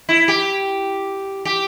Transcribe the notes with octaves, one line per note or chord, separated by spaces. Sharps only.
E4
G4
G4